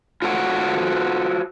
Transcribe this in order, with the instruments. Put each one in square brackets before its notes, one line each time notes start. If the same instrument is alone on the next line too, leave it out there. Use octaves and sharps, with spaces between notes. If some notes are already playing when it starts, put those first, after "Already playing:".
[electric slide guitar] F4 F#4 A4 C5 F#5